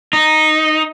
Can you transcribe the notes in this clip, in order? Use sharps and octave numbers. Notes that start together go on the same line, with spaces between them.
D#4